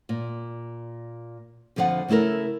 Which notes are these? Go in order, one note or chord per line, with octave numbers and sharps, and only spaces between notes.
A#2
F2 D3 F3 F5 F#5
C#3 A3 E4 A4 A#4